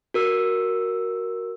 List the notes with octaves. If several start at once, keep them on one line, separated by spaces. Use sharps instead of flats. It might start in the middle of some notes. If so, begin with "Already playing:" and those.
F#4 A#4 E6